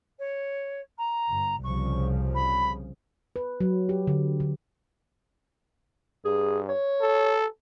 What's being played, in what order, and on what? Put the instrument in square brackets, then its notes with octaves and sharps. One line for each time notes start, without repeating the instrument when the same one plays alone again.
[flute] C#5
A#5
[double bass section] G1
[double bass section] C2 C#3 F3 [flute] C#6
[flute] B5
[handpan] B4
F#3
G4
D3
D3
[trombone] G2 [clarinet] G#4
[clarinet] C#5
[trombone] A4